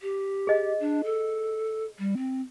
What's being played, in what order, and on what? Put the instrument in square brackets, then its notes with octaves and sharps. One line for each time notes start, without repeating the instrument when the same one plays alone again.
[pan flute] G4
[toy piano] G#4 D#5
[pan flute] D4
A4
G3
C4